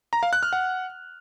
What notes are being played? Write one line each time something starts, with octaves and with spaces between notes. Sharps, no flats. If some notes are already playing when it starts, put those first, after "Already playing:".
A#5
F5
F#6
F6
F#5